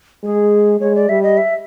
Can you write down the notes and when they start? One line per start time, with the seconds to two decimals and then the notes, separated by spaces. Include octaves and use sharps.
0.23 G#3 G#4
0.80 G#3 C#5
0.95 D5
1.09 G3 E5
1.23 D#5
1.37 E5